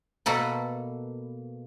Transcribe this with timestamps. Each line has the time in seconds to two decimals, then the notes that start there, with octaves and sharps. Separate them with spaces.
0.26 B2 A#3 A4 B4